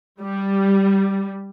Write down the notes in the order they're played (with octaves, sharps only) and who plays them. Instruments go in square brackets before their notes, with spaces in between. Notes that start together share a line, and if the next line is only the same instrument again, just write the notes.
[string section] G3